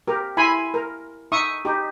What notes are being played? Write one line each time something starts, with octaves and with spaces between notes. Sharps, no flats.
G4 A#4
E4 G#5 B5 C6
A#4
D#4 E5 C#6 D#6
D#4 G4